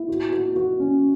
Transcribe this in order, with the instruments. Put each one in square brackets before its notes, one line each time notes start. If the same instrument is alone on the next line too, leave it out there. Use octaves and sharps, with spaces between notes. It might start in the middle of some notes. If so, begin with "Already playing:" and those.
Already playing: [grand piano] E4
F#4
F#4
F#4
C#4